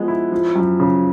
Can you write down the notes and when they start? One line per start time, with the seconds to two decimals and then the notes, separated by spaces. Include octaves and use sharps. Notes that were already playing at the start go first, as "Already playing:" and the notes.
Already playing: F3 G#3 B3
0.08 E4
0.32 F3
0.56 F#2
0.80 C#3